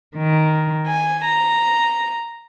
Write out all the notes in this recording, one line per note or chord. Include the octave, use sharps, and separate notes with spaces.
D#3
G#5
A#5